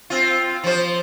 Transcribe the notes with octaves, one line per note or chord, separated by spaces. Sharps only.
C4 F4
F3 C5